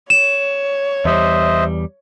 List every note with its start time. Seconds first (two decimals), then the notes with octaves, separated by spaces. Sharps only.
0.10 C#5 E7
1.05 E2 G3 C5 D#5 E5